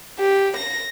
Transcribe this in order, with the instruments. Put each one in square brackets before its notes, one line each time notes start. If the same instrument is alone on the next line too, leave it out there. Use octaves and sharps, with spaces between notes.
[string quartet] G4
A#6